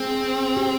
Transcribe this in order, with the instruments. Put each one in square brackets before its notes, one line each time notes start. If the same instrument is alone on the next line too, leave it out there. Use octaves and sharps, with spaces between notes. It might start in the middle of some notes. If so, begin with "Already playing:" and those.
Already playing: [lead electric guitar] C4 [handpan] G#4
[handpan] G4